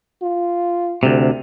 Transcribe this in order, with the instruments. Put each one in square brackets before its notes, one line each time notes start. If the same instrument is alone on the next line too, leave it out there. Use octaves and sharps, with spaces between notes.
[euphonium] F4
[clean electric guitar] D2 C3